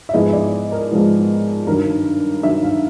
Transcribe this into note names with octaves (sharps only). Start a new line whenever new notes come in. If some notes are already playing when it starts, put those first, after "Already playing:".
E5
G#2 F3 G#3 B3 E4 D#5
D5
A#4
G#2 F3 G#3 B3 E4
G2 D#3 F#3 A#4
G2 D#3 F#3 E5
F5